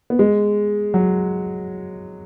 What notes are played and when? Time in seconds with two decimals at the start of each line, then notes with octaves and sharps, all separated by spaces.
0.10 B3
0.19 G#3
0.94 F#3